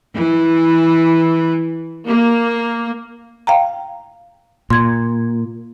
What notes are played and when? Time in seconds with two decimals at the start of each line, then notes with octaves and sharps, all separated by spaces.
0.14 E3
2.05 A#3
3.47 F5 G5 A#5
4.70 A#2 C6 G#6